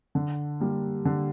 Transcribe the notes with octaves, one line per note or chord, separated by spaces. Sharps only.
D3
G3 A#3
D3